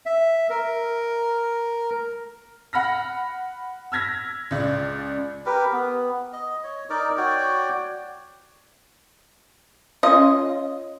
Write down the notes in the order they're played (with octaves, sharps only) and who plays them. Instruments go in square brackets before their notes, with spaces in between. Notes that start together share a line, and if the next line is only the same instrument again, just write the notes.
[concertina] E5
A#4
[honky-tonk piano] F#5 B5 F6 A#6
E6 F6 G#6 A#6 B6
C#2 D5
[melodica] G4 A#4 B4
B3
D#5
C#5
D#4 A#4 D5
F#4 C#5 D5 G5
[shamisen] C#4 F4 [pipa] D#5